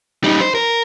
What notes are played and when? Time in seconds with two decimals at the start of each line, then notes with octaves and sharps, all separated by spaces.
0.24 G3 D#4
0.41 C5
0.55 A#4